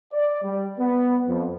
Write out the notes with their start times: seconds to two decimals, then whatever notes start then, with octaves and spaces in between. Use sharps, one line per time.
0.12 D5
0.43 G3
0.78 B3
1.27 F2